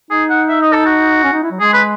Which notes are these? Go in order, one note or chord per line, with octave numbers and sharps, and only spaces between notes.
D#4 G#4
F#5
E5
D#5
A4
F#4
C#4
D#4
E4
F#3
G#3 G#4
B4